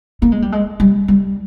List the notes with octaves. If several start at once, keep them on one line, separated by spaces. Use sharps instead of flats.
A#3
G#3
G3
G#3
G3
G3